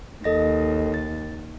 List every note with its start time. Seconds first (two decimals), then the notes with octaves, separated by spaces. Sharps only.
0.24 D#2 A4 D#5 A#6
0.94 A6